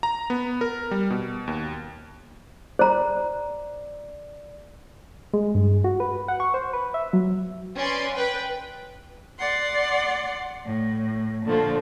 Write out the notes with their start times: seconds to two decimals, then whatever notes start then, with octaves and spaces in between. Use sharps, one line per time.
0.03 A#5
0.30 B3
0.61 A#4
0.91 G3
1.10 B2
1.47 D#2
2.79 C5 D5 A#5
5.34 G#3
5.55 G2
5.84 F#4
6.00 B4
6.28 F#5
6.40 C#6
6.54 C5
6.73 B4
6.94 E5
7.13 F#3
7.75 C#4 B4 D5 C6
8.14 B4 G5
9.39 D5 F#5 C6
10.65 A2
11.44 A#2 D3 F3 A3